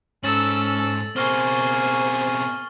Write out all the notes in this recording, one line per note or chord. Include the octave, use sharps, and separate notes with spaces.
G#2 C#4 A4 E6 A6 F#7
B2 A#3 C4 G#4 C5 C#6 F6 G7